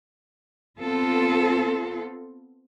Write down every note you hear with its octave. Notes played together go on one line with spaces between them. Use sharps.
B3 C4 F4 A4